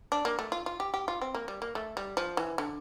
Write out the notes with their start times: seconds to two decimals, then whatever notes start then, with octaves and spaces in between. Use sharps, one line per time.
0.12 D4
0.25 A#3
0.39 A3
0.52 F4
0.66 F4
0.80 G4
0.94 G4
1.08 F4
1.21 C4
1.35 A#3
1.48 G3
1.62 A#3
1.75 A3
1.97 G3
2.17 F3
2.37 E3
2.58 D3